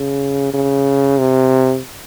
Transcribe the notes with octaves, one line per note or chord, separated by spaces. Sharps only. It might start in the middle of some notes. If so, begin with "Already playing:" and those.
Already playing: C#3
C#3
C3